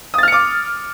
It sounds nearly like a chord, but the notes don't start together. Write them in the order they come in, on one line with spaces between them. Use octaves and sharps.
D#6 A6 F6 C#7 D6